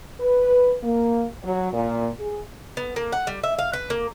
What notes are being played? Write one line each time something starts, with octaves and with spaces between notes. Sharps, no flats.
B4
A#3
F#3
A#2
G#4
B3
A#3
F#5
G3
E5
F5
B4
A#3